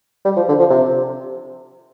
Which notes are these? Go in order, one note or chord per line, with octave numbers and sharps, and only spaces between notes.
G3
F3
D3
F3
C3